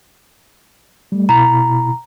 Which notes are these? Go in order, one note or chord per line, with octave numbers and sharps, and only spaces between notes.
G3 A3
B2 E4 A#5 B5